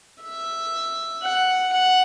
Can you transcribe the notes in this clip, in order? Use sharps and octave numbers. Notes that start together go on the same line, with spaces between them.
E5
F#5
F#5